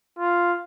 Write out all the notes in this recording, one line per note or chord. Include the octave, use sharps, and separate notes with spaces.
F4